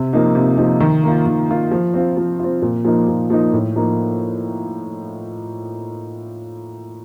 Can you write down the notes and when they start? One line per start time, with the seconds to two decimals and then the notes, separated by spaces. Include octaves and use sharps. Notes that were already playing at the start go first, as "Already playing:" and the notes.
Already playing: C3
0.13 F3 A#3 D#4
0.35 C3
0.58 F3 A#3 D#4
0.80 D#3
1.03 A#3 F4
1.26 D#3
1.48 A#3 F4
1.71 F3
1.94 C4 F4
2.17 F3
2.39 C4 F4
2.62 A#2
2.84 F3 A#3 D#4
3.08 A#2
3.30 F3 A#3 D#4
3.53 A2
3.76 F3 A#3 D#4